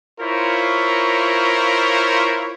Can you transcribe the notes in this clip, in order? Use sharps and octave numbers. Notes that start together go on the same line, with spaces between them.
E4 F4 A#4 C5 C#5